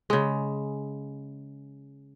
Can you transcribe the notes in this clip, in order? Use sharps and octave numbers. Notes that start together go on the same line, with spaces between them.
C#3 G#3